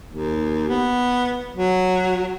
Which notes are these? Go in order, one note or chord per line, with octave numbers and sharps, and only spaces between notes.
D#2
B3
F#3